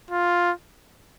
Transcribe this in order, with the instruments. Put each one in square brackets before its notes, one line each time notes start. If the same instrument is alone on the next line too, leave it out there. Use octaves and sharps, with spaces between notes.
[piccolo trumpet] F4